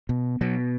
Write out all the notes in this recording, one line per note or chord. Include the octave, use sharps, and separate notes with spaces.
B2
B2 F#3